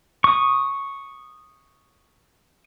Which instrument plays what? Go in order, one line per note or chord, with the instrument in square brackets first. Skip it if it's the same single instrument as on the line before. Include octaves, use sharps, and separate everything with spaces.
[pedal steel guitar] C#6 D#6